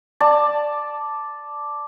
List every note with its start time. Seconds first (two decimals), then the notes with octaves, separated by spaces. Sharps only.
0.20 D5 A5